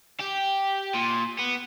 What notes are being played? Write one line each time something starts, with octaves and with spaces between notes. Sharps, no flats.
G4
A#2
B3